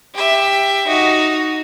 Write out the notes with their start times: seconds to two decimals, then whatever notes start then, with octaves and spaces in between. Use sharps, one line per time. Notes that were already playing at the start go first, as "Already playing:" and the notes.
0.15 G4 E5
0.87 D#4 F#4